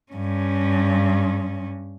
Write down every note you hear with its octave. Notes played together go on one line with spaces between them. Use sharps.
G2 C#4